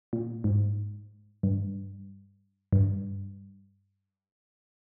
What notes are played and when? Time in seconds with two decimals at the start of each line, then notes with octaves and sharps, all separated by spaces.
0.13 A#2
0.44 G#2
1.43 G2
2.73 G2